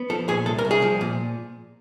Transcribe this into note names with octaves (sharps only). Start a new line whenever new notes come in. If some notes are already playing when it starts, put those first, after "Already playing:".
Already playing: B3
F3 A4
A#2 G#4
C2 A4
A#4
C2
G#4
F3
A#2